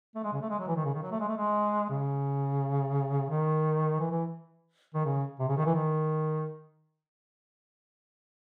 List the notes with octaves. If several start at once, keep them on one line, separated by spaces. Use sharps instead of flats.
A3
G#3
C#3
A3
G#3
F#3
E3
D#3
C#3
D#3
F#3
A3
G#3
A3
G#3
C#3
D#3
E3
E3
D#3
C#3
C3
C#3
D#3
E3
D#3